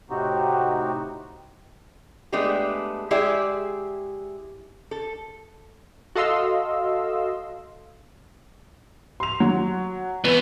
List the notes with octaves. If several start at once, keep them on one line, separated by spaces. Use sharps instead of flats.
A2 C3 C4 D#4 F#4 G4
G#3 A3 B3 D4 G4 G#4
G#3 E4 G4 G#4 D5 E5
A4
F#4 A4 D#5 F5 C6 E6
C6 F7
F#3
E3 B3